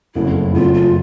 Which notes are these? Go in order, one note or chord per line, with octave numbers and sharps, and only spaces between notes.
F#1 F2 C#3 F#3 A3 E4
F#1 F2 C#3 F#3 A3 F4
F4